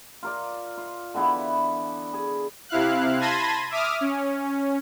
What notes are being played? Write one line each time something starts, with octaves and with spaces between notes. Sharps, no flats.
F4 A#4 D5
F4
D3 E3 B3 E4
G#4
C3 E4 F5 F#6
A5 B5 C6 G#6 A#6 D#7
E5 D6 D#6 F6
C#4